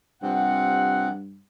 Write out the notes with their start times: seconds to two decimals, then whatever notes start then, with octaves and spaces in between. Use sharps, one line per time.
0.22 G2 C3 F3 C4 F#5